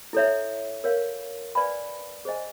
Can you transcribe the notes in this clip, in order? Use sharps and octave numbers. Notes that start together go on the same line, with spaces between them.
E4 A4 C#5 E5
A#4 C#5 F5
B4 D5 F5 G#5 B5
G#4 C5 D#5 G#5